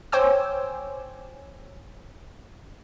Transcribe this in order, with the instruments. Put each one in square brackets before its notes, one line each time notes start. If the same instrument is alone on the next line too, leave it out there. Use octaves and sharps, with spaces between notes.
[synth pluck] C5 C#5 G5 G#5 D6 E6